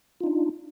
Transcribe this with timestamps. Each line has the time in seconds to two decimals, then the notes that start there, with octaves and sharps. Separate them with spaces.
0.20 F4
0.24 D#4
0.27 D4